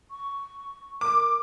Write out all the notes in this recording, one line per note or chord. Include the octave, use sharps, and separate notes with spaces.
C#6
A#4 D6